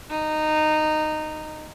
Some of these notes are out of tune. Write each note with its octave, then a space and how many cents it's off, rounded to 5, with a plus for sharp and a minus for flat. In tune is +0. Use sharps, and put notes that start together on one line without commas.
D#4 -15